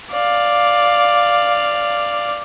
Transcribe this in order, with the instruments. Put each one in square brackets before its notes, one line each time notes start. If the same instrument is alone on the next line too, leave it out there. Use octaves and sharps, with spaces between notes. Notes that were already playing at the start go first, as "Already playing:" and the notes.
[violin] D5 F5